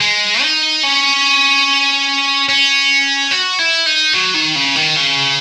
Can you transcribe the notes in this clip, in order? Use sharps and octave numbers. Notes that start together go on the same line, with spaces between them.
G#3
D#4
C#4
C#4
F#4
E4
D#4
F#3
D#3
C#3
D#3
C#3